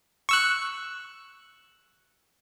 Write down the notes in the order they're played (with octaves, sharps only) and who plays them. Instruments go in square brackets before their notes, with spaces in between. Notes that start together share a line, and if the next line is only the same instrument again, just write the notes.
[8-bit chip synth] C#6 E6 F#6